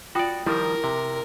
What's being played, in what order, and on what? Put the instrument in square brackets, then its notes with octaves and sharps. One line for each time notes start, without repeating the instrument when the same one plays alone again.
[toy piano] F4 G5 D#6 [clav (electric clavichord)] F#4 D5
[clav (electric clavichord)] D#3 F3 G3 [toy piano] E4 [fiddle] A#4
[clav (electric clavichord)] C3